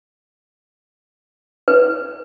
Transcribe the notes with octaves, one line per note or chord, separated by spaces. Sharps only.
B4